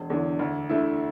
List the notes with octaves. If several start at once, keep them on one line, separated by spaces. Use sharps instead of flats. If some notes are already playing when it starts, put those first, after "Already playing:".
Already playing: E1
E2 D3
D2
D3 A3 E4